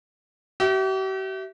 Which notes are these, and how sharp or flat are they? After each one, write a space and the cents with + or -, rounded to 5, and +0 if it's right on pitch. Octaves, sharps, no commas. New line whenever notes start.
G4 -45 E5 +0